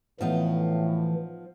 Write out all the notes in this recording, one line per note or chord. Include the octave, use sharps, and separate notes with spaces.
A2 E3 F3 B3 D#4